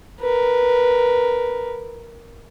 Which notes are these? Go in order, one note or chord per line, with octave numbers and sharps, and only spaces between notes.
A#4 B4